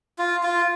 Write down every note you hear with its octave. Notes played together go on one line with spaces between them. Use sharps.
F4
F4